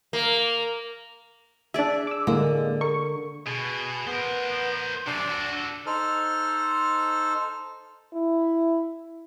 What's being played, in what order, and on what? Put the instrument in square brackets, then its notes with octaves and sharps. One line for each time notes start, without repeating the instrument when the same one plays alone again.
[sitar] A#3
[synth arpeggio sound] D4 E5 [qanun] G#4 D5
[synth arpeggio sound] D6 E6
[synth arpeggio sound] A2 G#3 A#3 [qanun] D3
[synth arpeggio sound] A#4 C#6
[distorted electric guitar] B2 [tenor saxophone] G#4
[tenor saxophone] B3 [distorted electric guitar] A#4 C5
[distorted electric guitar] F#2 C3 [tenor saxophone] D4
[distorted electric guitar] F#4 A4
[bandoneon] D#4 A4 C5 F6
[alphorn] E4